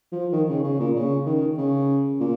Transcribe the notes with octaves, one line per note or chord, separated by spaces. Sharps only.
F3
D#3
C#3
C#3
A#2
C#3
D#3
C#3
A#2